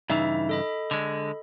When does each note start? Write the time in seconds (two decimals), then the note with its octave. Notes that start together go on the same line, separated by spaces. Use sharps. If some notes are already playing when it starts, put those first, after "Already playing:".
0.10 G2 C#3 E3 D#4 E5
0.49 A4 D#5 B5
0.91 D3 G#3